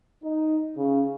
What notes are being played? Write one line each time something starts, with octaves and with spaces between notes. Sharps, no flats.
D#4
C#3